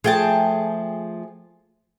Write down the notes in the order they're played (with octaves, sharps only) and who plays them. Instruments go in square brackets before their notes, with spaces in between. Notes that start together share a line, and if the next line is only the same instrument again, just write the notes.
[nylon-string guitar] F3 A3 [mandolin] G#4 G5 A5